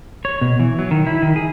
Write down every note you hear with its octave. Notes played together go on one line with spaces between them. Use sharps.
C#5
B2
E3
F#3
D#3
E4
D#3
G#4